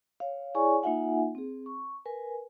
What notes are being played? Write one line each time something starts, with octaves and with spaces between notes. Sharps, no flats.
C#5 F5
E4 G#4 C#5 D5 G#5 C#6
A#3 D#4 F4 E5 F#5 G#5
C4 G#4
C#6
A#4 B4 G#5